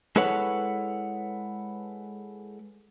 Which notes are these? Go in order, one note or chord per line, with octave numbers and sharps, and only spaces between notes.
G#3 E4 A4 B4 C#5 F#5